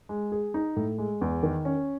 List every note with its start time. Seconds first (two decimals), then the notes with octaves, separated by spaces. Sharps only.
0.09 G#3
0.32 G#4
0.54 D#4
0.76 A2
0.98 G#3
1.21 E2
1.43 D#3
1.65 C#4